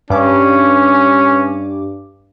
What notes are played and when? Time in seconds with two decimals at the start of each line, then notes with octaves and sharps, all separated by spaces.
0.10 G2 C#4 D6